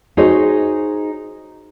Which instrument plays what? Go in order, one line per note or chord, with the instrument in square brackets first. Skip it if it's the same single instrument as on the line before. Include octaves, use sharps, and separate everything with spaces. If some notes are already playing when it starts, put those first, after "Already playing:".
[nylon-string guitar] D#4 F#4 G#4 C5 C#5 D#5